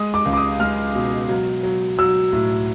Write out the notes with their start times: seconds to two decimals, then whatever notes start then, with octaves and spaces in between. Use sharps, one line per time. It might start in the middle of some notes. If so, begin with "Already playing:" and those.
Already playing: G#3 D#6
0.14 D6
0.25 C#2
0.33 D6
0.37 D#6
0.60 G#3 F6
0.95 B2
1.29 F#3
1.63 F#3
1.98 F#3 E6
2.33 A2